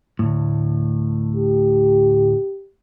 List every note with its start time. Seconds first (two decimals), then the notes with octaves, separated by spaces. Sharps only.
0.19 D2 A2
1.36 G4